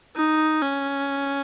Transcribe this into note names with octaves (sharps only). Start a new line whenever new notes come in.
D#4
C#4